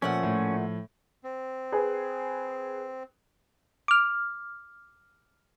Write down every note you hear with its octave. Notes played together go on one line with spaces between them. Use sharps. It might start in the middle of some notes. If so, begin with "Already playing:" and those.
A#2 F3 A3 C#4 F#5
A2
C4
G#4 B4
D6 F6